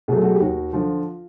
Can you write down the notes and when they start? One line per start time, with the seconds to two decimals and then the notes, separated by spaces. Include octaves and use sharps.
0.08 B2 F#3 A3 F#4 G#4
0.24 F#4 G#4
0.35 G4
0.40 D#2 F#4
0.73 D3 F3 F4